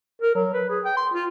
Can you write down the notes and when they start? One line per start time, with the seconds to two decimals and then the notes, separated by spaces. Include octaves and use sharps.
0.22 A#4
0.35 F#3
0.54 B4
0.70 G#4
0.85 G5
0.97 C6
1.14 F4